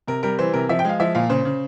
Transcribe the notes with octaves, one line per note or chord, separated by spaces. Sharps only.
C3 A#4
G3 A#4
E3 C5
C3 A#4
F3 E5
G5
G#3 F5
F3 E5
A#2 F5
C#3 C5
C#3